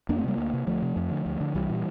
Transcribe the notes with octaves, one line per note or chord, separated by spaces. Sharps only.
F2 A#3 D4
A3 C4
C3 G3 A#3
D2
C3
D2 F3 A3
C3
F2
D3
D2
D3
C2 E3 G3
A#2